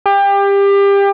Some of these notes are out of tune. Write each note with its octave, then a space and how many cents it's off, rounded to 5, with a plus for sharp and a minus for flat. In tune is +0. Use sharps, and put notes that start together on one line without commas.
G4 +25